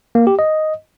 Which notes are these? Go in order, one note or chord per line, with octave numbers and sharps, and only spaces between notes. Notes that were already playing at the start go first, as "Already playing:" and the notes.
A#3
G4
D#5